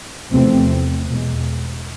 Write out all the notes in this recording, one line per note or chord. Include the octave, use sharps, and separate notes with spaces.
E2 C3 F3 A3 C4
E2 B2 G#3